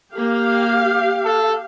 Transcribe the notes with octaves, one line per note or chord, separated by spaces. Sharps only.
A#3 G4 F5
A4